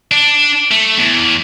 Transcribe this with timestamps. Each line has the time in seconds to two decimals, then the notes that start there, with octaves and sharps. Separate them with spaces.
0.11 D4
0.71 A3
0.98 E2